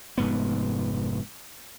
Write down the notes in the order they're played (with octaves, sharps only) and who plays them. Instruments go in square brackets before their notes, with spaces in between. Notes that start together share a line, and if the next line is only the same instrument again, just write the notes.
[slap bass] F1 G#2 B3